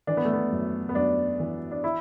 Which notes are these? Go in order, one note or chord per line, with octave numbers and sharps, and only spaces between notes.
E3 D4
B3
A3
B3
F#2
B3
F#2 D4
E3
D4
E4